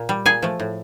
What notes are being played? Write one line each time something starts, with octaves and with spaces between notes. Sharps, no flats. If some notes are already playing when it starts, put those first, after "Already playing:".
Already playing: A#2
G3
A#2 G#4 G#5
F3 A3
A2